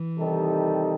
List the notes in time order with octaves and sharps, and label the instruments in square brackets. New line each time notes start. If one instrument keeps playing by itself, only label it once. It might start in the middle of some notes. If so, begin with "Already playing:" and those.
Already playing: [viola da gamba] E3
[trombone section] C3 D#3 G3 D#4 A4